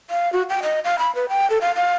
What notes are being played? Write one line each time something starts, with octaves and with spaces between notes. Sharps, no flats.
F5
F#4
G5
D#5
F5
B5
B4
G5
A4
F5
F5